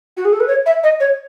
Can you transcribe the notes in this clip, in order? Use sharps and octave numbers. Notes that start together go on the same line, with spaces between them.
F#4
G#4
A4
B4
C#5
E5
D#5
C#5